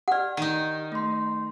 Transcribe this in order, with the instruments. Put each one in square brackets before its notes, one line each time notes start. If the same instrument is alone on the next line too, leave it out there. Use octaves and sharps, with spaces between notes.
[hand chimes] G4 F6 [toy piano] D5 F#5
[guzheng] D#3 D#4
[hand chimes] A3 C6